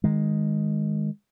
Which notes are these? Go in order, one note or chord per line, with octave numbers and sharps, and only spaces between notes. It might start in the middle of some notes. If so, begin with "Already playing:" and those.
D#3 G#3